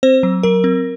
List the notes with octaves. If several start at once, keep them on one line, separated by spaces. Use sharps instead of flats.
C4 C5
F#3
F#3 A#4
C4